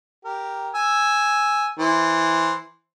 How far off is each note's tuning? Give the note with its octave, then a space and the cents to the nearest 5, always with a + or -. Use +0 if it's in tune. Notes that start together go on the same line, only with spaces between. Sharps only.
G4 +0 A#4 +0
G#5 +0 E6 +0
E3 -5 C5 +0